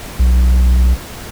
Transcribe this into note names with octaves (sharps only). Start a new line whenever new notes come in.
B1